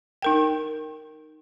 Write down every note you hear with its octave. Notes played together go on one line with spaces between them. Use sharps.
D#4 A#4 G5